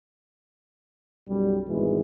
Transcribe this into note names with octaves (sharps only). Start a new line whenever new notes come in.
B1 F#2 G3
G#1 B2 E3 G#3